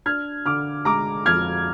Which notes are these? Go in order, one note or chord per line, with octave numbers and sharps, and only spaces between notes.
D4 F6 G#6
D3 D6 F6
G#3 A#5 D6
F2 F6 G#6